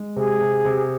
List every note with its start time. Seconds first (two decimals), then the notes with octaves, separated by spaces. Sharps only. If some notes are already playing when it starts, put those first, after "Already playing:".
Already playing: G#3
0.16 C3 G#4
0.41 C3
0.65 C3